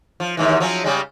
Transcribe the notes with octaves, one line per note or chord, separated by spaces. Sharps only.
F3
D#2 G#2 E3
F3 F#3 C#4
C#3 G3 G#3